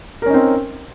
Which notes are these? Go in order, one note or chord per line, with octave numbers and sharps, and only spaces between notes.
C4 C#4 D#4 A#4